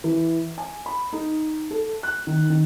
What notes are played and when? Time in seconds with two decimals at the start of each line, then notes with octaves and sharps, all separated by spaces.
0.04 E3
0.58 G#5
0.86 B5
1.13 D#4
1.71 A4
2.03 F#6
2.27 D#3
2.50 D#3